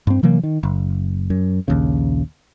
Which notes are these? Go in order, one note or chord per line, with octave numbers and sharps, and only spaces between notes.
G2 C4
C3 E3 F#3 A#3
D#3
F#1
F#2
A#1 D#2 C#3